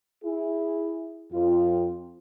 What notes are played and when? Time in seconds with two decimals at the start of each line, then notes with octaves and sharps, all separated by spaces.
0.24 E4 G#4
1.33 F2 F4